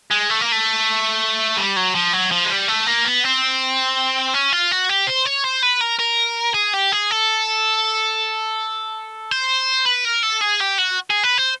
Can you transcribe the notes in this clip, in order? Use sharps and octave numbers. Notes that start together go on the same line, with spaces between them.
G#3
A3
A#3
A3
G3
F#3
F3
F#3
F3
G#3
G3
A3
A#3
B3
C4
C#4
F4
F#4
G4
C5
C#5
C5
B4
A#4
A#4
G#4
G4
G#4
A4
C5
B4
A#4
A4
G#4
G4
F#4
G#4
B4
C5